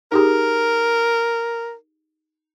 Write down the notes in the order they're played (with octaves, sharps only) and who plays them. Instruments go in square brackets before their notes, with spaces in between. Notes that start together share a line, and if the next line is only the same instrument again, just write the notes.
[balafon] D#4 G4 G#4 [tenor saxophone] A#4